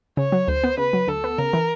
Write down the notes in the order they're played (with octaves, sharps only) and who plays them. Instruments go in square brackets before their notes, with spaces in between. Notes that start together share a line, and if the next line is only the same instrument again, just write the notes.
[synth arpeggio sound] C#3 [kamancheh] C#5
[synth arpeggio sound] F#3
[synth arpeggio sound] D2 [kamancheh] C5
[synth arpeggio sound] B3
[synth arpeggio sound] C#3 [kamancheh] B4
[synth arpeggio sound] F#3
[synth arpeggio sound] D2 [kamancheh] A4
[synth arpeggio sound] B3
[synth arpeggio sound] C#3 [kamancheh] A#4
[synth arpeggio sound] E3